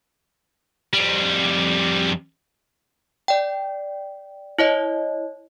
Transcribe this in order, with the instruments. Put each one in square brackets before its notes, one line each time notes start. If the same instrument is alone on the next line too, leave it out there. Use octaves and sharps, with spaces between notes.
[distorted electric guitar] F2 G3
[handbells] D5 G5
E4 C#5 D#5